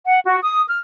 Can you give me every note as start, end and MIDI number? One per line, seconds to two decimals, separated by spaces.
0.07 0.19 78
0.26 0.37 66
0.42 0.63 87
0.70 0.79 89